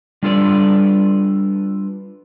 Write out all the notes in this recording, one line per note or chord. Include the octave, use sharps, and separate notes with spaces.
G3 D4 F4 A4 B4 D5